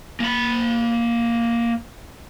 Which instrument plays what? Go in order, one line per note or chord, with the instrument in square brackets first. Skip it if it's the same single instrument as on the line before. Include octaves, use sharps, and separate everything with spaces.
[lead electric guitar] A#3 B5